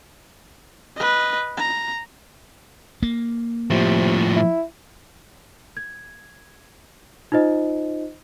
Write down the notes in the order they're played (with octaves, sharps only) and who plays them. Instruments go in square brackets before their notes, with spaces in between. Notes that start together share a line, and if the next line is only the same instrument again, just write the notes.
[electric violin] B4 D#5
A#5
[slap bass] A#3
[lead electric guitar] A2 F3 [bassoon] C3
[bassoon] E4
[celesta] G#6
D#4 F4 C5 D#5